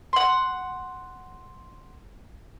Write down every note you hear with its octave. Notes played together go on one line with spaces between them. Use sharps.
F#5 C6